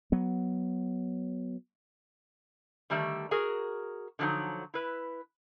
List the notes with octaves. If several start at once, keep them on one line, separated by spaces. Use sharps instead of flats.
F#3 B3
D3 D#3 G3 A3
F#4 G#4 A#4
D3 F3 F#3 C#4 D#4
E4 B4